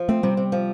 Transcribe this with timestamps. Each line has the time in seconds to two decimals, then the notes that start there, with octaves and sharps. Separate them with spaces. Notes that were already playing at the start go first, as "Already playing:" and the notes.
Already playing: F3
0.09 A3 C4
0.23 C3 G3
0.37 C3
0.52 F3